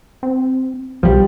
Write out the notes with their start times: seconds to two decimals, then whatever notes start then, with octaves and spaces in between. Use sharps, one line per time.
0.23 C4
1.03 B1 F3 G3